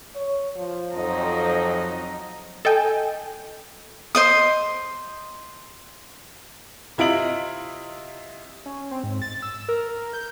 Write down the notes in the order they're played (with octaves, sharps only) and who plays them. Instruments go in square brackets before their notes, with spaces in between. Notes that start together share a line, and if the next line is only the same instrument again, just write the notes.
[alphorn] C#5
F3
[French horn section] F2 [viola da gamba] F#3 D#4
[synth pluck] A4 D#5 G5 G#5
[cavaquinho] C5 D#5 D#6
[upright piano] C3 E4 F4 D#5 D7 F#7
[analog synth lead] C#4
C4
G#2
A6
E6
A#4
G6